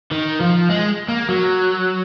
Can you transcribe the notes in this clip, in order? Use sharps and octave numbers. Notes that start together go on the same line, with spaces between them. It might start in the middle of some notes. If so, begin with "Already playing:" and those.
D#3
F3
G#3
A#3
F#3